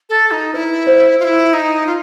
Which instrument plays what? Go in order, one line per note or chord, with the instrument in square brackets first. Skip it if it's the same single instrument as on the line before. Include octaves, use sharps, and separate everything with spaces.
[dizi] A4
D#4
[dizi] E4 [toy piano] B4
[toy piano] C5
[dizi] F4
E4
D#4
F4